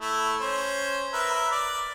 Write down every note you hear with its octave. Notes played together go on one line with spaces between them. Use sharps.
A3 E4
C#4 C5
A#4 B4 E5
D5